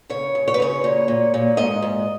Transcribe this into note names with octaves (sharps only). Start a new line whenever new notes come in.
C#3 C#5
C#3
C#5
B4
C#3 C#5
A#2
A#2
A#2
G#2 D#5
G#2